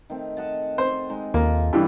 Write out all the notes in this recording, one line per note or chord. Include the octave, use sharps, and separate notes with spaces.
D#3 A3 C4
D#5 F#5 A5
C4 C5
G#3 D#4
D#2 A#3 F4 A4
G2 E3